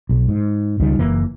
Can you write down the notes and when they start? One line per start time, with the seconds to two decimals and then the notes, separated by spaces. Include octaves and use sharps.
0.09 B1
0.28 G#2
0.80 C#2 D#3 G3
0.99 F#1 E3 A#3